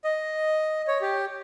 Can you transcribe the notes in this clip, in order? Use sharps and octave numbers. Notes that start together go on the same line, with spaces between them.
D#5
C#5
G4